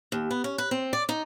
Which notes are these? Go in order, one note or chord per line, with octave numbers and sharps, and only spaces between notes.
D#2
B3
C#4
B4
C4
D5
D#4